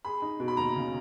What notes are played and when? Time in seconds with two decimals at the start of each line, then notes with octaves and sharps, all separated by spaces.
0.05 G#4 B5
0.22 D#4
0.40 B2
0.48 B5
0.57 D#2 A#5
0.75 C#3